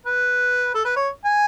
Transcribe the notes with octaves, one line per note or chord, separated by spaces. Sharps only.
B4
A4
B4
C#5
G#5